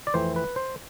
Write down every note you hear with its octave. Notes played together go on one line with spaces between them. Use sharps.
D5
F2 E3 A3 C4 C5
B4
C5